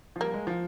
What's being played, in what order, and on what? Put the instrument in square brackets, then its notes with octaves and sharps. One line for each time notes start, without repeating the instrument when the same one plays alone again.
[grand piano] F3
[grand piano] G3 [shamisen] A#3
[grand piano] G#3
F3